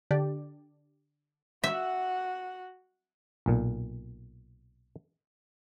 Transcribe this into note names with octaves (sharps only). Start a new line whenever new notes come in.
D3 D4 G4 D5
F#4 E5 F#5
B1 A#2